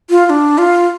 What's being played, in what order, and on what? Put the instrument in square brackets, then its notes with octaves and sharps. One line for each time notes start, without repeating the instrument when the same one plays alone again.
[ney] F4
F4
D4
F4